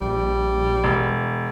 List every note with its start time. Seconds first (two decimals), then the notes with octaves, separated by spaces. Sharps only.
0.01 A#1 G3
0.84 E1